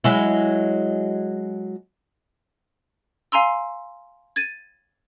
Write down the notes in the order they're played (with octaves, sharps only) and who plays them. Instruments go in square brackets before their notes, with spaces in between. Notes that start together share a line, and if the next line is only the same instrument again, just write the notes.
[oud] F#3 G#3 E4
[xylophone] F5 G#5 A#5 C6 E6
G#6 A6 D#7